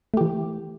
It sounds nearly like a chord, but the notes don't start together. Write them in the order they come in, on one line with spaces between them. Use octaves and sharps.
A3 G4 E3